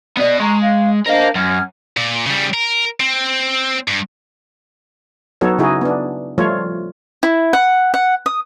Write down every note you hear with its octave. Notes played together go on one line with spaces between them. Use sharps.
B3 D5 D#5
G#3 A#5 C#6
F5
D4 A#4 C5 D#5 F5
F#2 F6 G#6
A#2
C#3 G3
A#4
C4
G2
F#3 B3 D#4 F#4 A4 C#5
C#3 D#4 E4 F#4 G#4
B3 D4
F3 G3 A3 F4 C#5
E4
F#5
F#5
D#6